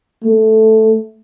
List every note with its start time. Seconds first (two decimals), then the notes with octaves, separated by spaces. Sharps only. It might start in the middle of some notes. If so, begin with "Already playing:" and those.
0.24 A3